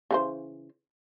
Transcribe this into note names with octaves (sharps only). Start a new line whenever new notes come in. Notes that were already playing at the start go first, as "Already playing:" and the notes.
C#3 E3 C5